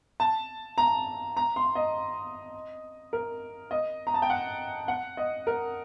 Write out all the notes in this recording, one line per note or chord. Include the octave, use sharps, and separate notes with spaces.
A5
A#5
A#5
C6
D#5
A#4
D#5
A#5
A5
G5
F#5
F#5
D#5
A#4